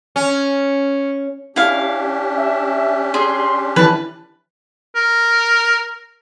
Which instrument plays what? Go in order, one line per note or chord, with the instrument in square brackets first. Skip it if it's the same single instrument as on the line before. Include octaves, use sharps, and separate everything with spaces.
[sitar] C#4
[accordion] C#4 D4 G4 [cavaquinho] E4 F5
[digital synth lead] E5
[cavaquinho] G#4 [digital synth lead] C6
[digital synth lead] E3 [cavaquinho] B4 A5
[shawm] A#4